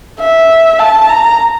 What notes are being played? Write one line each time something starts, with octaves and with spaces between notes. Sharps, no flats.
E5
A5
A#5